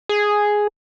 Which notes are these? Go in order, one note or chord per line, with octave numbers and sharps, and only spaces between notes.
G#4